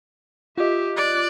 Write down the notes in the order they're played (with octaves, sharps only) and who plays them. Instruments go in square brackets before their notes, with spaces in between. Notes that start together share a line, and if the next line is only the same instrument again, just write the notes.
[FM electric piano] F4 D#5 [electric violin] G4 E5
[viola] D5 [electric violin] F#6